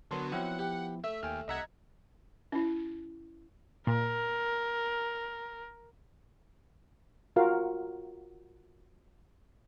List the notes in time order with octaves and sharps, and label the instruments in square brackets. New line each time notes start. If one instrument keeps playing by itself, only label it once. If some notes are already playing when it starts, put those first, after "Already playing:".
[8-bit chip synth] D3 F#3 B3 [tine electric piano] A#4 A5 C6
[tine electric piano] F3 B3 E4 [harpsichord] F#3 C4 [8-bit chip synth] F#5
[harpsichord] G4
[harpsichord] A3 [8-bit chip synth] E5
[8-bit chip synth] D#2 [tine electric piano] G5 G#5 F6
[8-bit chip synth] C2 E5 F#5 [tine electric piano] D#5 A#5 G#6
[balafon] C#4 E4
[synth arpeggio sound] A#2 [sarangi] A#4
[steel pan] F4 F#4 A#4 F5